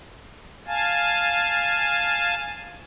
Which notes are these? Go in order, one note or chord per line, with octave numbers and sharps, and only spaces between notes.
F5 G#5 A5